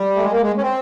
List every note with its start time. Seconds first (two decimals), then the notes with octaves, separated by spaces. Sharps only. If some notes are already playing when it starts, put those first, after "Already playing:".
Already playing: G3
0.15 A3
0.22 G#3
0.31 A#3
0.42 G#3
0.57 C#4
0.62 C4